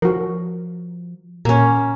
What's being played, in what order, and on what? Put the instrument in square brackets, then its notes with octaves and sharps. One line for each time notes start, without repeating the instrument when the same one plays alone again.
[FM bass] F3 [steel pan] F#4 A#4
[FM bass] A#2 [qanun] A#3 C#4